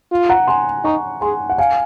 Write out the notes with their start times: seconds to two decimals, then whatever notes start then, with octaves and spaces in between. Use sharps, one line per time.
0.11 F4
0.29 F#5 A#5
0.47 G#5 C6
0.84 D#4 A#5 C#6
1.21 G#4 G#5 C6
1.49 F#5
1.58 F5 G#5